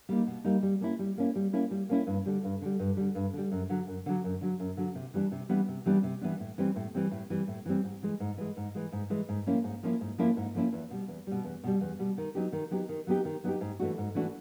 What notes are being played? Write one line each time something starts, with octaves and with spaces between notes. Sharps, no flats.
G3 A#3 D#4
B2
G3 A#3 D#4
G3
A#3 C#4 E4
G3
A#3 C#4 E4
G3
A#3 C#4 E4
G3
A#3 C#4 E4
G2
D3 G3
G2
D3 G3
G2
D3 G3
G2
D3 G3
F#2
D3 F#3
F#2
D3 F#3
F#2
D3 F#3
F#2
D3 F#3
C3
E3 G3 B3 D4
C3
E3 G3 B3 D4
C3
E3 G3 B3 D4
C3
E3 G3 B3 D4
A2
E3 G3 C4
A2
E3 G3 C4
A2
E3 G3 C4
A2
E3 G3 C4
G#2
E3 G#3
G#2
E3 G#3
G#2
E3 G#3
G#2
E3 G#3
G#2
F3 A#3 C#4 E4
G#2
F3 A#3 C#4 E4
G#2
F3 A#3 C#4 E4
G#2
F3 A#3 C#4 E4
E2
B2 G3
E2
B2 G3
E2
B2 G3
E2
B2 G3
D#3
F#3 B3 D#4 G4
D#3
F#3 B3 D#4 G4
D#3
F#3 B3 D#4 G4
D#3
F#3 B3 D#4 G4
G#2
E3 A3 D4 F#4
G#2
E3 A3 D4 F#4